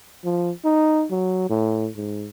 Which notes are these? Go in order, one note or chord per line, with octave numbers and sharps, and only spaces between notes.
F3
D#4
F#3
A2
G#2